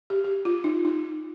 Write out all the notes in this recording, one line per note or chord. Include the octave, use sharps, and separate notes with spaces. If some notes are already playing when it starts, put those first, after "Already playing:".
G4
G4
F4
D#4
D#4